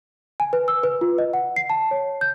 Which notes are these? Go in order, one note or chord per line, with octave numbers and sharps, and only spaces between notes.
G#5
B4
E6
B4
F4
D#5
F#5
C7
A5
C#5
G6